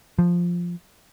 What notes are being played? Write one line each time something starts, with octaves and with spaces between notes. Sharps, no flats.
F3